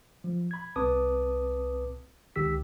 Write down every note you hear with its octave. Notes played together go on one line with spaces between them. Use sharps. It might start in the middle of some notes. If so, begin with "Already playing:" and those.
F3
B5 G#6
C2 C4 B4 A5 D6 D#6
C#2 D#3 G4 E6 B6